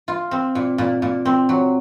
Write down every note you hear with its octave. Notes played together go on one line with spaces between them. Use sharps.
F4
C4
A#2
A#2
A#2
C4
F#3